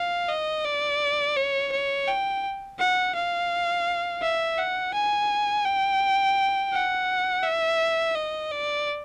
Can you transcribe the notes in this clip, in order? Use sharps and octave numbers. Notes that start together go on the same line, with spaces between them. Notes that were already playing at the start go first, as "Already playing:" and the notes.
Already playing: F5
D#5
D5
C#5
C#5
G5
F#5
F5
E5
F#5
G#5
G5
F#5
E5
D#5
D5